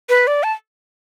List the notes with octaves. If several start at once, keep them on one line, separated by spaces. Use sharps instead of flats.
B4
D5
A5